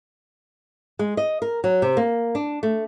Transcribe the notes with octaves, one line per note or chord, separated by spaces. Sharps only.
G#3
D#5
A#4
F#3
C3
A#3
D4
A3